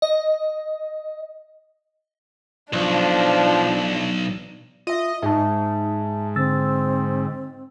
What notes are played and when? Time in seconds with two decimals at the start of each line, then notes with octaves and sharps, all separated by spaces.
0.02 D#5
2.73 B1 F3 D4
4.87 F4 D#5 E5
5.22 G#2 D#4 E5 A5
6.36 D3 C4 E6 A6